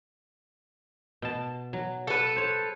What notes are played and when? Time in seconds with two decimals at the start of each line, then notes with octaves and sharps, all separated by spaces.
1.22 B2 A5
1.73 F#3
2.07 A4 B4
2.36 C5 C#5